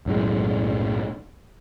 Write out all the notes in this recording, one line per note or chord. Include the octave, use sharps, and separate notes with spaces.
B1 F#2 A2 G#3